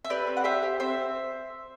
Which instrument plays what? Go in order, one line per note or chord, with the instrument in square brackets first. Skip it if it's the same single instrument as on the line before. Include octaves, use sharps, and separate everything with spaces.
[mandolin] E5
G4 B4 D5
C4
F#5
G4 C5 E5
G4
C4 C5 E5